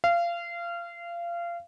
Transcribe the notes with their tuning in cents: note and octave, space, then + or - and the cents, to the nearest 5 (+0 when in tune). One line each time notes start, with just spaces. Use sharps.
F5 -25